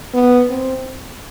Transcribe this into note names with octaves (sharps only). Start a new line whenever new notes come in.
B3
C4